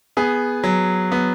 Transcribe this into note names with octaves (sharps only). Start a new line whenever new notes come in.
B3 G#4
F#3
B3